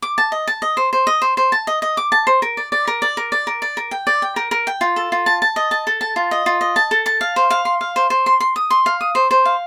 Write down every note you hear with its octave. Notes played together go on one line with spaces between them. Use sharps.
D6
A5
D#5
A5
D#5
C5
C5
D#5
C5
C5
A5
D#5
D#5
D6
A5
C5
A#4
D5
D5
A#4
D5
A#4
D5
A#4
D5
A#4
G5
D5
G5
A#4
A#4
G5
F4
A4
F4
A5
A5
D#5
A5
A4
A5
F4
D#5
F4
D#5
A5
A4
A5
F5
C5
F5
C6
F5
C5
C5
C6
C6
D#6
C6
F5
D#6
C5
C5
F5